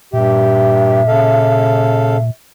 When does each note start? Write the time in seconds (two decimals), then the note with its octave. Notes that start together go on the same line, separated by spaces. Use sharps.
0.13 G2 A#2 G4 E5
1.07 C#3 A4 F5